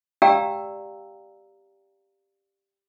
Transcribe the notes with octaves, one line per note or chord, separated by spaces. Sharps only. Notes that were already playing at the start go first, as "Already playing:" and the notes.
G4 D5 F5 G5 A#5 E6